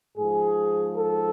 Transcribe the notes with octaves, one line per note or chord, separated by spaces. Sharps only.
G#2 F3 G#4
A4